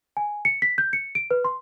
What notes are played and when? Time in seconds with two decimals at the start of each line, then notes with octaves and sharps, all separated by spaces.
0.17 G#5
0.45 C#7
0.62 B6
0.78 G6
0.93 C#7
1.15 D7
1.31 B4
1.44 C6